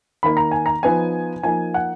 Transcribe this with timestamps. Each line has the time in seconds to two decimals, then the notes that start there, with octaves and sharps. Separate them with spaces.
0.23 D#3 A#3 D#4 B5
0.37 A#5
0.51 G#5
0.66 A#5
0.83 F3 B3 D#4 G#5
1.43 F3 A#3 D#4 G#5
1.74 F#5